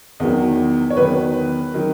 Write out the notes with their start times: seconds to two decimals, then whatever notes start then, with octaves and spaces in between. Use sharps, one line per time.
0.20 E2 D#3 F#3
0.90 C#5
0.97 E2 D#3 F#3 B4
1.74 D#3 F#3